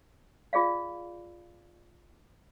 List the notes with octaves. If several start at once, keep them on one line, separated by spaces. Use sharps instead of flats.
F4 G#4 D5 F5